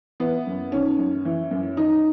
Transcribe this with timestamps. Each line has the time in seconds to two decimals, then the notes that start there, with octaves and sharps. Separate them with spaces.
0.20 E3 B3
0.47 F#2
0.72 D#3 C#4
0.98 F#2
1.25 E3
1.51 F#2
1.77 D#3 D#4